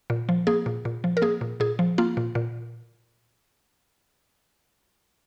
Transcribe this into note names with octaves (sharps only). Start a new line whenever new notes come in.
A#2
F3
A#3 G#4
A#2
A#2
F3
A#4
A#3 G#4
A#2
A#2 G#4
F3
A#3 F4
A#2
A#2